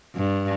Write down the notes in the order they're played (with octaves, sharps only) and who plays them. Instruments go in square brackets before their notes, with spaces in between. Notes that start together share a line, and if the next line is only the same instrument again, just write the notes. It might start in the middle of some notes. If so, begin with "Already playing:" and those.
[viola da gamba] G2